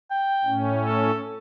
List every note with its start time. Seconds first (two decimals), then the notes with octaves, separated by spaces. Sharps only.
0.10 G5
0.45 A2 C#4
0.85 A4